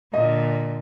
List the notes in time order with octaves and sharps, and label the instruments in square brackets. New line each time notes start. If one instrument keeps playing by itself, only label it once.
[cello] A#2 D3 [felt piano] D#5